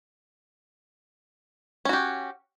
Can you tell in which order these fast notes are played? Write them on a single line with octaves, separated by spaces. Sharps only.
C#4 F#4 G4